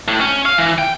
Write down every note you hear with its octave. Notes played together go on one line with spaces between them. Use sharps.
A2
C#4
F5
E3
G5